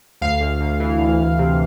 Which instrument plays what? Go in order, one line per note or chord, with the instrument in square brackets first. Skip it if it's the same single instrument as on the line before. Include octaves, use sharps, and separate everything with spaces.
[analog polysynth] D2 F5
D2
D2
E3
D2
D2
C3